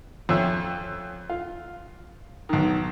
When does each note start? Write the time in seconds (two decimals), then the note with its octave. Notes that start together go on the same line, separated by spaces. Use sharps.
0.29 F2 C#4 E5
1.29 F4
2.49 B1 D#3